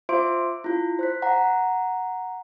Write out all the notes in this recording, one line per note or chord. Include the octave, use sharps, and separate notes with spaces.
F4 C5 E5 C6 D6 D7
E4 F4
C5 F#6 B6
F#5 A#5